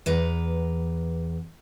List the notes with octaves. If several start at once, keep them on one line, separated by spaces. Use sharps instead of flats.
E2 B4 A#5